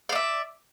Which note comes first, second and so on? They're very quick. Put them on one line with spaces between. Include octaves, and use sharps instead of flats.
F5 D5 E5